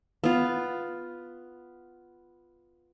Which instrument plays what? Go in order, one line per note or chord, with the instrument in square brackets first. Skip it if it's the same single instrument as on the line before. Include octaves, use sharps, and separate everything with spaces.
[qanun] B3 F4